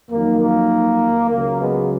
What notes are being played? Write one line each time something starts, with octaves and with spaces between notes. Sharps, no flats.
F2 D#3 F#3 A#3
A#3
C#2 C#3 F#3 A#3
G#3 B3